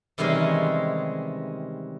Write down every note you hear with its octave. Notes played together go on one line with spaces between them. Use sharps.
C3 D#3 E3 G3 G#3 C#4